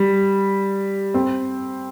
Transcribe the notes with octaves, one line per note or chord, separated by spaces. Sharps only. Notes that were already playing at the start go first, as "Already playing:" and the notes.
Already playing: G3
C4